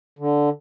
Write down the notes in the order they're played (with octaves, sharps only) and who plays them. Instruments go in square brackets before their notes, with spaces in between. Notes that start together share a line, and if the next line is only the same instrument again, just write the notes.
[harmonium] D3